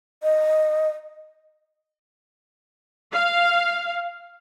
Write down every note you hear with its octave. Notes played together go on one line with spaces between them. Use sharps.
D#5
F5